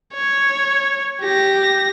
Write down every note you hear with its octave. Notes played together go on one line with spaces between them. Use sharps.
C#5
G4 A#6